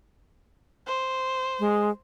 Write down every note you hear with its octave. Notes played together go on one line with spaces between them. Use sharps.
C5
G#3